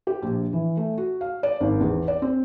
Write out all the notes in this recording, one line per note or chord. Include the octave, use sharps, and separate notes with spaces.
G4
A#1
E3
A3
F#4
F5
D5
G#1
E2
D5
C4